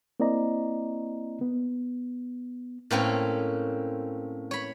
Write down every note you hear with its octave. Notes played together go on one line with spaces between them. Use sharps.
A#3 C4 E4 D5 D#5 A#5
B3
A2 A#3 C4 C#4
C#5 B5